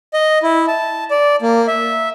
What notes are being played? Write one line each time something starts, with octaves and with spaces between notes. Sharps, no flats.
D#5
E4
A5
D5
A#3
E5